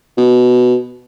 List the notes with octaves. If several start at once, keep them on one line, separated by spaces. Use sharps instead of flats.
B2